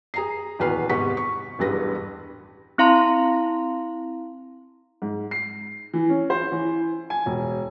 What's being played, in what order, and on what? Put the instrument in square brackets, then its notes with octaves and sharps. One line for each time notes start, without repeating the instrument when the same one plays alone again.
[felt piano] G#4 A#5 C7
D#1 E2 F#4 B4 F6 C7
G#2 C3 B3 C#6 B6
C#6
E1 A1 G2 B4 A#6
[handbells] C4 E4 F5 A#5 C6
[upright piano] G#2
C7
E3
C#4
C5
E3
G#5
E1